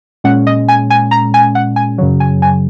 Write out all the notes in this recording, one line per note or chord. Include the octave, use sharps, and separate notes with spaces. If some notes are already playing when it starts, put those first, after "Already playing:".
A#2 G#3 C#4 F#5
D#5
G#5
G#5
A#5
G#5
F#5
G#5
F#2 C#3 F#3
G#5
G#5